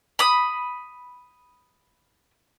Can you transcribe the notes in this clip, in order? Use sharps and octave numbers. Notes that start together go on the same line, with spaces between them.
B5 D#6